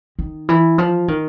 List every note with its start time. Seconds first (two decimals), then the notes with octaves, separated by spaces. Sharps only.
0.19 D#3
0.49 E3
0.78 F3
1.08 D#3